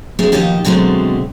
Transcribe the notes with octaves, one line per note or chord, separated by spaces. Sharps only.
F#3 A3 B3 C#4 E4 G#4
D#2 B2 F3 D#4 G4 A5
B2 D3 F#3 G#3 A3 C4